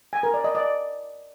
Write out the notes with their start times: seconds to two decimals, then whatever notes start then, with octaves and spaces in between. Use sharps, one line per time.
0.13 G#5
0.23 A#4
0.34 D5
0.44 D#5
0.55 D5